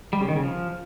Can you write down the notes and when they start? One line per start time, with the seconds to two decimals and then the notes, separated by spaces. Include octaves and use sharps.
0.13 G3
0.20 C#3
0.28 D#3
0.36 C#3
0.43 F3